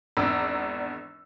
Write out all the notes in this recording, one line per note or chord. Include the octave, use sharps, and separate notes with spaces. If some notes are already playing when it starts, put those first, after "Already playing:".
G#1 E2 D4 A#5 E6